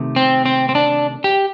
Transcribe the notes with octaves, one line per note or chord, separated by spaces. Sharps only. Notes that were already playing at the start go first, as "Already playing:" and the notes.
Already playing: C3 D#3 A3
C4
C4
C4
D4
G4